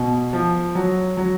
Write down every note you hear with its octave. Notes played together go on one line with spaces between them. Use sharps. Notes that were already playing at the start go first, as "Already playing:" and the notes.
Already playing: B2
F3
F#3
F#3